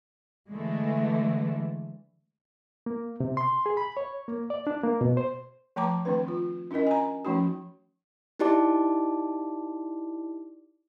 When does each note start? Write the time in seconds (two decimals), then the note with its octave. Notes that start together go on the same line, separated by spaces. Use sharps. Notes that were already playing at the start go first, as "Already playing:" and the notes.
0.49 D3 E3 G#3 A3
2.86 A#3
3.20 C3
3.37 C6
3.66 G#4
3.77 B5
3.97 C#5
4.28 A#3
4.50 D5
4.67 D4
4.83 A#3
5.01 B2
5.17 C5
5.76 F3 A3 A5 A#5 D6
6.05 D#3 A3 C4 D4 B4
6.28 F4
6.71 C#4 D4 E4 A#4 D#5
6.87 G#5 A#5
7.25 F3 A3 C#4 D#4 F#4
8.39 D#4 E4 G4 D5 A5 D6